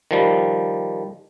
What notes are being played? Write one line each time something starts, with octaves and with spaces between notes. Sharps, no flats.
D#3 F3 G3